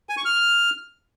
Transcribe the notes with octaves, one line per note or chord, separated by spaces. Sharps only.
G#5
C#6
F6